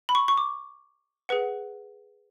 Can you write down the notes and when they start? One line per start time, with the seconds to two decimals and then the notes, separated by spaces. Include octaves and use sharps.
0.09 B5
0.15 C#6
0.28 C#6
0.38 D6
1.29 G#4 B4 F#5